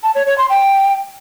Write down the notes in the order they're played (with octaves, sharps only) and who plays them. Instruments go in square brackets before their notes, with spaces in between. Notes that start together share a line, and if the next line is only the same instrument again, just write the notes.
[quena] A5
C#5
C#5
C6
G5